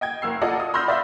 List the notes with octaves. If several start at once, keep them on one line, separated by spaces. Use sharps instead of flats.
D#5 G5 G#6
F#1 A#4 E6 C7
F4 A4 D5 D#5 F#5 A#5
D#6
B5 C6 E6 F6 G6 A#6
D5 E5 F5